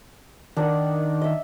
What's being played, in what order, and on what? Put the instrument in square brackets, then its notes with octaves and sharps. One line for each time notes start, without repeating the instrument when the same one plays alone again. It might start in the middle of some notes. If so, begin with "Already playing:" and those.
[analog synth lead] D#3 [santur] D4 D5 F#5
[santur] D#5 E5